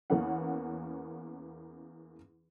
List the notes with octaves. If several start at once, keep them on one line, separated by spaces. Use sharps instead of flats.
E2 A#3 B3 C#4 F#5